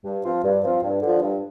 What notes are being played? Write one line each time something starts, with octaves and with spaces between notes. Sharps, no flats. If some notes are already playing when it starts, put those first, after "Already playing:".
G2
F3 C4 F4
G2
F3 C4 F4
G2
D3 F3
G2